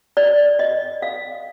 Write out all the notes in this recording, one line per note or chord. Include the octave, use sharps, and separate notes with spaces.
D5
D#5
F5